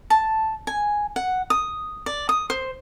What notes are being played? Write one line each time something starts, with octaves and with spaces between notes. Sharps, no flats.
A5
G#5
F#5
D#6
D5
D#6
C5